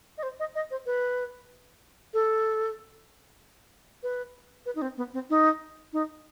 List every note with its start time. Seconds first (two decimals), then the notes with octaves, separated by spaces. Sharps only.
0.18 D#5
0.23 C5
0.40 D#5
0.55 D#5
0.71 C5
0.86 B4
2.14 A4
4.03 B4
4.66 B4
4.75 D#4
4.82 C4
4.97 B3
5.14 C4
5.30 D#4
5.93 D#4